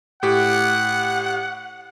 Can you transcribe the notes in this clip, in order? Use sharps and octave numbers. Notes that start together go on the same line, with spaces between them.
A2 G4 F#5